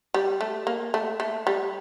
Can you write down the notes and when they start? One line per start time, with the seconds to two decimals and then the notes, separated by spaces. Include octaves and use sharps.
0.14 G3
0.41 A3
0.67 A#3
0.94 A3
1.20 A3
1.47 G3